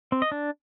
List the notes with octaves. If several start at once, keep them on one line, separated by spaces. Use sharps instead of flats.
C4
D#5
D4